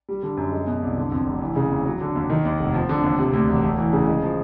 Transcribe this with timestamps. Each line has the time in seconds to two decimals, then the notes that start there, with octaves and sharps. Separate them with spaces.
0.09 G3
0.23 D3
0.37 F#2
0.52 G#3
0.67 B2
0.82 C2
0.97 D3
1.12 F2
1.27 F1
1.41 E3
1.56 C#3
1.71 D#2
1.85 F#3
2.01 D3
2.16 D#2
2.30 D#3
2.45 D#2
2.60 F1
2.74 F3
2.89 D3
3.04 D#2
3.19 C3
3.33 D2
3.48 E1
3.62 A3
3.78 E3
3.93 C#3
4.07 G#3
4.22 F3